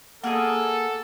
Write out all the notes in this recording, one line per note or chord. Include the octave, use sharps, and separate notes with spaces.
A#3 G#4 A4 D#5 F#5